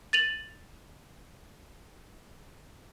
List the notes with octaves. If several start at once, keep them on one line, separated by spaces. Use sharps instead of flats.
A6 D#7 F7 F#7